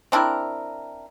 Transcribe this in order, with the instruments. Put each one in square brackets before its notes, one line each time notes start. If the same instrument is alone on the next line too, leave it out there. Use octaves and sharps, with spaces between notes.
[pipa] C4 D4 E4 A#4